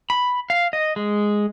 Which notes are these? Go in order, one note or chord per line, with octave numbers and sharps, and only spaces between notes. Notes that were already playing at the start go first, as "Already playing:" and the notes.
B5
F5
D#5
G#3